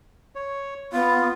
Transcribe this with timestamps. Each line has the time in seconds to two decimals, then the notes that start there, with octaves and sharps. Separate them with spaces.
0.35 C#5
0.93 B3 F4